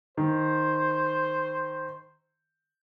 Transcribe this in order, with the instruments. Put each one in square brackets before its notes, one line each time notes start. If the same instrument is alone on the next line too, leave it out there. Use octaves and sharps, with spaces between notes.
[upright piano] D#3 [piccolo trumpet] C5